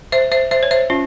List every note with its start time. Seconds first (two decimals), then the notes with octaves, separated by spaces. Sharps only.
0.12 C5 E5
0.31 C5 E5
0.51 C5 E5
0.63 C#5
0.71 C5 E5
0.90 C#4 F4